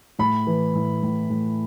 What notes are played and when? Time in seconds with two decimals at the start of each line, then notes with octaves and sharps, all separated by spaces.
0.19 A2 B5
0.47 E3
0.75 A2
1.03 A2
1.30 A2